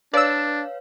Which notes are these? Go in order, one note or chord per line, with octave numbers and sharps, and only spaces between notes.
D4 B4 C#5 D5 F5 E6